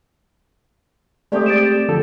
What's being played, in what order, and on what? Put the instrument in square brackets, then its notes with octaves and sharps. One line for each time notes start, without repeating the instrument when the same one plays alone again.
[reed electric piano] G#3 A3 C4 [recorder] G4 [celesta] D5 D#6
[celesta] A6 D7 E7
[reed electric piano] D3 F3 A4